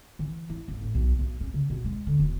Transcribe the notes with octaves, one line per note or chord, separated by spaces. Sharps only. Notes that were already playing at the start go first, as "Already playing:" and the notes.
E3
E4
G#1
A2
B1
B1
C#4
C#3
B2
G#3
D3
E1